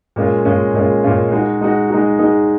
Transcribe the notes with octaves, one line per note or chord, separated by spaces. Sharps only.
A#2 G#3 C#4 F4
A#2 G#3 C#4 F4
A#2 G#3 C#4 F4
A#2 G#3 C#4 F4
G#3 D#4 F#4
G#3 D#4 F#4
G#3 D#4 F#4
G#3 D#4 F#4